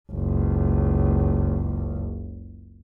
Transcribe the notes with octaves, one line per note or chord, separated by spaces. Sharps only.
F#1 C#2